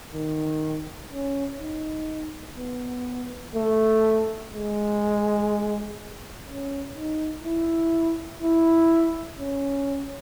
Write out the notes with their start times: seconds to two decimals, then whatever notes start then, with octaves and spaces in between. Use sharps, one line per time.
0.13 D#3
1.11 C#4
1.59 D#4
2.58 B3
3.55 A3
4.53 G#3
6.47 C#4
6.96 D#4
7.44 E4
8.42 E4
9.39 C#4